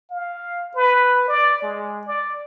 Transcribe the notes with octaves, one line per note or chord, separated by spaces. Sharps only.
F5
B4
D5
G#3
D5